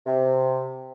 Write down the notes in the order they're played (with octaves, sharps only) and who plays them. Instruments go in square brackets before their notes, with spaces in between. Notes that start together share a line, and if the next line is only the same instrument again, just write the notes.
[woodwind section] C3